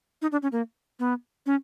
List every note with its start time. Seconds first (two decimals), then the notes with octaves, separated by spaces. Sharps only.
0.22 D#4
0.32 D4
0.43 C#4
0.52 A#3
0.99 B3
1.46 C#4